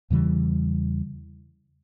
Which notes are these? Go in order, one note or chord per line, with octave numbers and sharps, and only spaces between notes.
E2 C#3 E3 G3